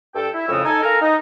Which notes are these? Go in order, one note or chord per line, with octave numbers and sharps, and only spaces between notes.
G2 A4 G5
E4
F2 A2 C#3 C#4 D#6 E6
D#4 A4 G#5
A4 A#4 F5 G#5 A#5
D#4